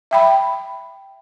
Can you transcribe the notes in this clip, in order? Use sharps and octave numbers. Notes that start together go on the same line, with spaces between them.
E5 G5 B5